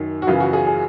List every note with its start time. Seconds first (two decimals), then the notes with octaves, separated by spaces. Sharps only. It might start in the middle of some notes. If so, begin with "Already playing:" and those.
Already playing: F#2 D#3
0.22 F#4
0.27 F#2 C#3 E3 F4
0.40 F#4
0.53 G#4
0.67 G#4